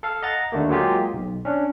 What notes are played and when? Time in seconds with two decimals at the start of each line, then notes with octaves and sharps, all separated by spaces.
0.03 A4 F5
0.23 D#5 F#5 A#5 A6
0.52 D#2 D3 A3 A#3
0.69 F#3 G#3 A#3 F4 G4 G#4
1.14 B1
1.45 C#4 D4